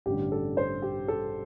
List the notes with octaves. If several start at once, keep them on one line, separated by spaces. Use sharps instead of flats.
A1 G2 D3 G4
A4
C5
G4
A4